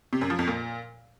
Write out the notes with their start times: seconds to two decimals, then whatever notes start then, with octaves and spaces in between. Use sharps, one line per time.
0.13 C3
0.21 F#2
0.30 F3
0.39 F2
0.47 A#2